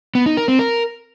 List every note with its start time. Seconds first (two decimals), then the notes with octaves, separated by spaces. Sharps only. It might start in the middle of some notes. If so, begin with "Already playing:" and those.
0.15 B3
0.26 D#4
0.37 A#4
0.48 C4
0.59 A#4